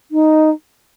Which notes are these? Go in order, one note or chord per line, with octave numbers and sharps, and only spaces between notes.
D#4